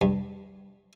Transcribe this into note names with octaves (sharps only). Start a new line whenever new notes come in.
G2